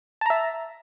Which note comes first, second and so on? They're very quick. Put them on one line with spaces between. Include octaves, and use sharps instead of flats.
A5 A#5 E5